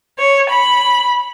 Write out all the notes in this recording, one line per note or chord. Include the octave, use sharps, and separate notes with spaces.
C#5
B5